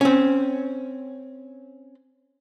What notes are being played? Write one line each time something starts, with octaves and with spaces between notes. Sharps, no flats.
C4 C#4